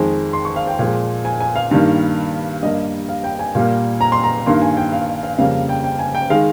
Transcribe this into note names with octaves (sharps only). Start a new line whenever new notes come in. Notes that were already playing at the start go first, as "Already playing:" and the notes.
Already playing: F2 D#3 G#3
C6
C#6
F5
G5
A#2 F3 G#3
G#5
G#5
F5
G2 D#3 G3 A#3
G2 G3 A#3 D#5
F5
G5
G#5
A#2 G3 A#3
A#5
C6
A#5
G2 D#3 A#3 C6
G#5
G5
F5
F5
F2 C#3 G3 A#3 F5
G5
G5
G#5
G5
D#3 G#3 F5